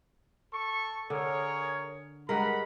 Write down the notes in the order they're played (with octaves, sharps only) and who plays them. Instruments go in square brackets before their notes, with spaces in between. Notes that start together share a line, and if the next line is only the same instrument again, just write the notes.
[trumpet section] A4 C#6
[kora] D3 [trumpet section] G#4 A#4 C#5
[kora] G2 G#3 A#4 [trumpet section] F#5 B5